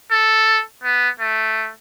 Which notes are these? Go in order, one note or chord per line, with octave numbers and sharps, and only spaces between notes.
A4
B3
A3